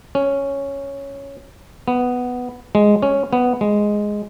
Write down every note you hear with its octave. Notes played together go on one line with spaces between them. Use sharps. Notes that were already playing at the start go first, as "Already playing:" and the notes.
C#4
B3
G#3
C#4
B3
G#3